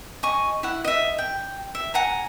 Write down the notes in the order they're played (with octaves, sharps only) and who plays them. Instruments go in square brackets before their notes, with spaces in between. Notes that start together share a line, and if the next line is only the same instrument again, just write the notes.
[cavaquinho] D#5 G#5 C#6
E4 F#5
D#5 E5
G5
E5
F#5 G#5 A#5